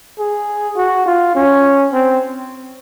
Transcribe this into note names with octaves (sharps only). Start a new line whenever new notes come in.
G#4
F#4
F4
C#4
C4